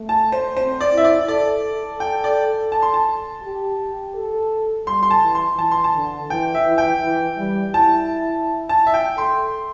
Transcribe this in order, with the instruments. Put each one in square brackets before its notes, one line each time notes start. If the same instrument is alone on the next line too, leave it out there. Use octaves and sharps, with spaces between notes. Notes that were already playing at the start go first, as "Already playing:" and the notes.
Already playing: [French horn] A3
[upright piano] A5
C5
[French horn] C4 [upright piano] C5
[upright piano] D5
[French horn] E4 [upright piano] E5
[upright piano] D5
[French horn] A4 [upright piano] D5
[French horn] A4
[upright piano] G5
D5
A5
C6
A5
[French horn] G4
A4
[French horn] G3 [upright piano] C6
[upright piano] C6
A5
[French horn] E3
[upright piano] C6
[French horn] E3 [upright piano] A5
[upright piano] C6
A5
[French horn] D3
[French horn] E3 [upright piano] G5
[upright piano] E5
[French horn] E3
[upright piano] G5
[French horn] E3
G3
[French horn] E4 [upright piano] A5
[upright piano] A5
E5
G5
[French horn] A4 [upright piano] C6